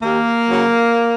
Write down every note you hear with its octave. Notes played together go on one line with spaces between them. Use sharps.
D#2 A#3
C#3 F#3